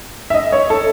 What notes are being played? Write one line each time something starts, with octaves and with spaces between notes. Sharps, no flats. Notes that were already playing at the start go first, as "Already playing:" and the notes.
E5
D#5
C#5
A4